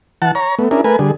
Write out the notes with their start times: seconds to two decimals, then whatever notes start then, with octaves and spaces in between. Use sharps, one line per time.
0.22 E3 F#5 A5
0.35 C#5 A#5
0.59 A3 B3
0.71 C#4 D4 E4 G#4 A#4
0.84 A3 A#4 B4 G#5
0.99 D3 G3 G#4